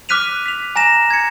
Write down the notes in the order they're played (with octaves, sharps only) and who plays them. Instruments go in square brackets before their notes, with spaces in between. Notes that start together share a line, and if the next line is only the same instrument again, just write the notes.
[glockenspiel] D6 F6 F#6 B6 D#7 F7
B6 F7
G#5 A#5 A#6 E7
G#6 C#7